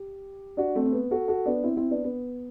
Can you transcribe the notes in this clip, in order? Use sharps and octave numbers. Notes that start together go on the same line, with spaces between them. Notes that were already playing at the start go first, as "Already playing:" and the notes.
Already playing: G4
D4 F#4
A3 C4
C4
B3
F#4 A4
F#4 A4
B3 D4
C4 E4
C4 E4
B3 D4
B3